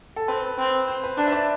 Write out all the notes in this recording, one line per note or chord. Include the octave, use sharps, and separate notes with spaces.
A4
C4 B4
C4
C5
B4
D4 B4
E5
D5